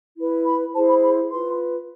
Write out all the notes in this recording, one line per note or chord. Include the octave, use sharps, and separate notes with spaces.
E4 B4
B5
E4 G#4 C5 A5
B5
B5
F4 B4 C6